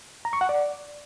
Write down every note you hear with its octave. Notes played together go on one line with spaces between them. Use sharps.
A#5
C#6
F#5
D5